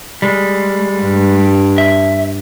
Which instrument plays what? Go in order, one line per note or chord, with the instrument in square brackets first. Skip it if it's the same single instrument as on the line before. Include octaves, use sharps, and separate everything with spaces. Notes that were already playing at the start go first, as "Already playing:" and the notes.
[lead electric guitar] G3 G#3
[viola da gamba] G2
[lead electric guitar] E5